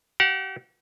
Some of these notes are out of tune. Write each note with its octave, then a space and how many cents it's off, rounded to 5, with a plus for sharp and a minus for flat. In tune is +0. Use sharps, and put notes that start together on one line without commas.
G4 -40 F#5 -35